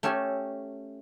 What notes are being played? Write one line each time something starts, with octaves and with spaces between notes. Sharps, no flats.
A3 C#4 G4 A4 G#5